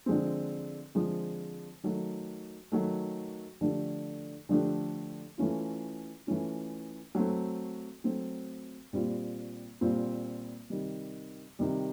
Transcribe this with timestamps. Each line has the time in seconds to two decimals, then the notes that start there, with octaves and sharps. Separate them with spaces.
0.06 D3 F3 G#3 C4
0.95 D3 F3 G#3 C4
1.83 D#3 F#3 A3
2.72 D#3 F#3 A3
3.61 D3 F3 A3 D4 G4
4.49 D3 F3 A3 D4 G4
5.38 E3 A3 C#4 F4
6.27 E3 A3 C#4 F4
7.15 F#3 A3 C4
8.04 F#3 A3 C4
8.93 A#2 G3 C4 F4
9.81 A#2 G3 C4 F4
10.70 C3 D#3 G3
11.59 C3 D#3 G3